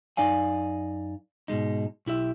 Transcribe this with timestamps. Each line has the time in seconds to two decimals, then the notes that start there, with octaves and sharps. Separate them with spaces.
0.17 F#2 D#4 D5 F5 G#5
1.48 G#2 B2 G#3 D#4
2.06 B1 E4 G4 E5